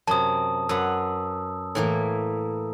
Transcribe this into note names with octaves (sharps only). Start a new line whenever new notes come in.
F#2 C3 A5 D#6
F#2 B4 F#5 E6
A2 E3 A#3